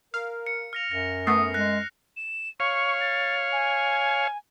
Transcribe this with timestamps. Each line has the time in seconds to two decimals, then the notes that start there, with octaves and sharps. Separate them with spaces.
0.14 A#4 F5
0.47 C#7
0.73 F6 A#6 F7
0.91 F#2 A#6
1.27 A3 B3 D#6 C7
1.54 G#3 F#6 A#6
2.17 E7
2.60 C#5 F5 C#6
3.01 A6
3.52 G#5